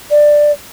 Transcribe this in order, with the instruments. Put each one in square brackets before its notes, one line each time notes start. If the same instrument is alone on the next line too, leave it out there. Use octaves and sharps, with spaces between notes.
[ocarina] D5